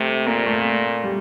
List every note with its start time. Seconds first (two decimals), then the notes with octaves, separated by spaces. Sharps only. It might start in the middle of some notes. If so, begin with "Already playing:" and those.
Already playing: C3 A3
0.27 A#2 A#3
0.47 A3
1.04 G3